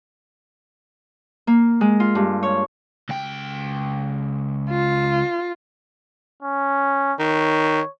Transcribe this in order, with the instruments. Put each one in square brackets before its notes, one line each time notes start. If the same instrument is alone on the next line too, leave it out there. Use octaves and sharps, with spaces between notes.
[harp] A#3
G#3
F4
G2
C#5
[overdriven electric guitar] C#2 G5
[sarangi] F4
[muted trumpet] C#4
[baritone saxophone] D#3 [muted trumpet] C#5